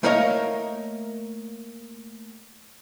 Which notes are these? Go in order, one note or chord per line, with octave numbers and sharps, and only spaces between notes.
A3 A#3 A#4 C#5 D#5 F5